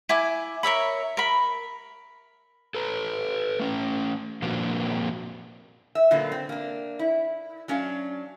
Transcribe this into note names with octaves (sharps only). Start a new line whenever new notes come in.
E4 G#5 D6
A#4 C#5 E5 B5
A#4 B5
A4 B4
A3 C#4
A#2 F3 A#3 C4 D4 F#4
E5
A#2 D3 F#3 A#3 B3
C4
A#3 D4
E4
F#3 C#4 D4 F5